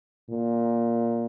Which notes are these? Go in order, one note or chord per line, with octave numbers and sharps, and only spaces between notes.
A#2